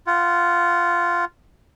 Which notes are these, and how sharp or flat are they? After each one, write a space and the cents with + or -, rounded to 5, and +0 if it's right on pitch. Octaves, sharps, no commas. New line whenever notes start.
F4 -5 F#5 +15